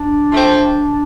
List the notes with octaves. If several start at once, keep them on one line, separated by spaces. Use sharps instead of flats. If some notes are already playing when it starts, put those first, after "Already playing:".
Already playing: D4
F3 A3 C4